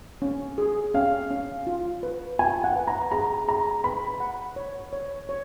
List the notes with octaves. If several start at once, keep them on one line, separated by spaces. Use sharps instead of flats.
C#4
G#4
C#4 F5
C#4
F4
B4
F4 G#5
F#5
B4
A#5
G#4 A#5
G#4 A#5
B4 B5
F#5
C#5
C#5
C#5